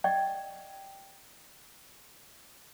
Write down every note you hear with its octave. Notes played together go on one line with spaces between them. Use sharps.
D5 D#5 G5